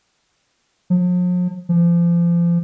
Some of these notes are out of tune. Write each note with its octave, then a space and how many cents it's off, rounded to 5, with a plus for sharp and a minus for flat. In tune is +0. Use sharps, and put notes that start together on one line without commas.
F3 +45
F3 -30